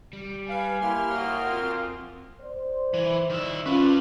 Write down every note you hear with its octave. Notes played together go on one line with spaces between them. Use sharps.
G3
B4 F5 G#5
A#3 E4 G4 C6 F6
F#4 C#5 E5 G5 D#6
C4 F4
C5 D5
E3
D#3 E5
C#4 D4 F4 B4